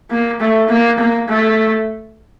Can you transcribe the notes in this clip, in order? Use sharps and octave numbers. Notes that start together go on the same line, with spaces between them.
A#3
A3
A#3
A#3
A3